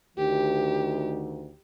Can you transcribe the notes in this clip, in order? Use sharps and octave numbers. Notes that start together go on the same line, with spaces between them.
D2 D#3 G4